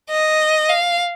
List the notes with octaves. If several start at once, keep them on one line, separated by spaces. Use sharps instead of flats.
D#5
F5